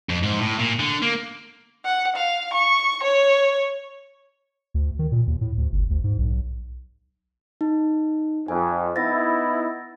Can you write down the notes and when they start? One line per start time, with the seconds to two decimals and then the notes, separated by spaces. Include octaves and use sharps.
0.09 F2
0.23 G#2
0.40 A2
0.59 A#2
0.79 D3
1.02 A#3
1.85 F#5
2.16 F5
2.54 C#6
3.04 C#5
4.74 D2
4.99 D#3
5.12 A#2
5.27 D#2
5.41 A2
5.58 D2
5.72 G1
5.90 D2
6.04 G#2
6.18 B1
7.61 D#4
8.48 F2 G#5
8.96 B3 D#4 E4 A6 A#6